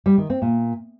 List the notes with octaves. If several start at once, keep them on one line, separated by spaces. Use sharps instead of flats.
G3
D#3
C4
A#2